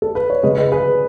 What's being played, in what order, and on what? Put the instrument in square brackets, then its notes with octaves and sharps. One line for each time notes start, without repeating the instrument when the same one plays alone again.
[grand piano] A4
B4
C#5
C#3 G#3 B4 D#5
B4 D#5
G#4 B4